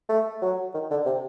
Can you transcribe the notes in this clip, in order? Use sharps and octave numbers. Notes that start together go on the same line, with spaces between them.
A3
F#3
D#3
D3
C3